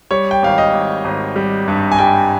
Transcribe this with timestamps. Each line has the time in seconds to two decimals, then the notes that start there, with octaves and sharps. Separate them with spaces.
0.11 G3 C#5
0.31 G5
0.43 G#1 F5
0.58 D#5
0.73 G#1
1.05 G#1
1.36 G3
1.68 G2
1.92 G#5
1.98 G3 G5